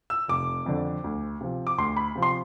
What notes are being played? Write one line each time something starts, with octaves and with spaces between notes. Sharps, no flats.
E6
F1 D6
F2 D3
D2
C3 F3
D6
D2 C6
B5
C3 F3
C6